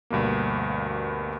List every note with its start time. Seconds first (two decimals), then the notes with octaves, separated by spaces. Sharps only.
0.10 D2 G2 B2 A#3